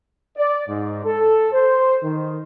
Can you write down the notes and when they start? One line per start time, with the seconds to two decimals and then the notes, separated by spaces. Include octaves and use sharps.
0.37 D5
0.68 G#2
1.04 A4
1.52 C5
2.03 D#3